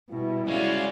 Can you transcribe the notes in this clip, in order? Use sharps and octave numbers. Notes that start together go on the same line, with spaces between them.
B2 G3 E4
G#3 C#4 F#4 D5 F5